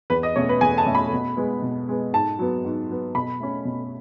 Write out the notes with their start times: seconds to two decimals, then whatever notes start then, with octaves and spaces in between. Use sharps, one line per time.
0.10 E2 B4
0.23 D#5
0.36 B2 A3 C#4 C#5
0.49 B4
0.61 E2 G#5
0.78 A5
0.86 B2 A3 C#4
0.95 B5
1.13 B2
1.37 G#3 B3
1.62 B2
1.88 G#3 B3
2.13 G#2 A5
2.39 F#3 B3
2.65 G#2
2.90 F#3 B3
3.15 B2 B5
3.40 A3 C#4
3.65 B2